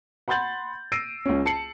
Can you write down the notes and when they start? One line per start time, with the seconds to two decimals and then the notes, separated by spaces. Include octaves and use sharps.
0.28 F#5 B5 C6 G6 A6 F#7
0.92 E6 A#6 C7 D7 D#7
1.26 C#2 C#4
1.46 A5 C7 C#7 F#7